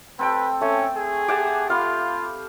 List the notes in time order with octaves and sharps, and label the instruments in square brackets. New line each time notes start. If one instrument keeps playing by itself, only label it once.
[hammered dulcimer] C4 A4 G5 [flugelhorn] B4
[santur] A3 [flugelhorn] C#4
[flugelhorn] G#4
[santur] G4 F#5 A5 [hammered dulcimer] D6
[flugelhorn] F4 [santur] F5 B5